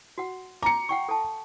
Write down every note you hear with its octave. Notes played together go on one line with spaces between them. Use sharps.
F#4 F#5
A#5 D6 C#7
F#5 G5 C#6
A4 A5